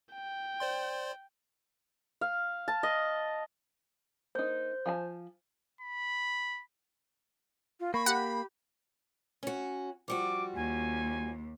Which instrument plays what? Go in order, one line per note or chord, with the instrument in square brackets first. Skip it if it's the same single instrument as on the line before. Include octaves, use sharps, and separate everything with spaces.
[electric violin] G5
[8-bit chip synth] C5 D5 C6
[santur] F5
A5
D#5
[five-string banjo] A#3 D#4 [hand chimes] C5 G6
[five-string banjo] F3 G#5 A5
[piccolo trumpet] B5
[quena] F4
[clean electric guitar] A#3 [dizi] B5 [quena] C#6
[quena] G4 [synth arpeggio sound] F#5
[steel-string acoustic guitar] C#4 F#4
[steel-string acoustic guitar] F3 G3 F#4 [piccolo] D6
[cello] D#2 [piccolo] G#5